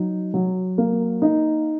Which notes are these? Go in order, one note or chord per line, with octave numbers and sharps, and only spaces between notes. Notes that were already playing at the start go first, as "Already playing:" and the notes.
Already playing: F#3 D#4
F#3
A#3
D#4